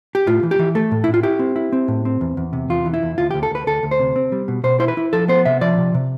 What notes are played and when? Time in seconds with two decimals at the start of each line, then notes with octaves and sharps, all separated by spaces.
0.15 G4
0.27 A2 F4
0.43 E3
0.51 G4
0.59 E3
0.75 A3 A4
0.91 A2
1.04 A2 E4
1.14 F4
1.23 E4 G4
1.39 C4
1.56 E4
1.72 C4
1.88 A2
2.05 C4
2.21 E2
2.37 E2
2.53 C3
2.70 E2 F4
2.86 E3
2.94 E4
3.03 E2
3.18 D2 F4
3.31 G4
3.34 D2
3.43 A4
3.51 D2 B4
3.67 D2 A4
3.83 D2
3.91 C5
4.00 C3
4.16 C4
4.32 G3
4.48 B2
4.64 B2 C5
4.80 E4 C5
4.88 B4
4.97 E4
5.13 F3 A4
5.28 B3 C5
5.45 C3 E5
5.61 F3 D5
5.78 C3
5.94 C3